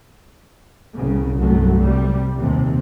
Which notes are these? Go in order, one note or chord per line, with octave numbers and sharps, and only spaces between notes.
C2 C#3
C2 G2 F#3 A3
C3 G3
D#2 C3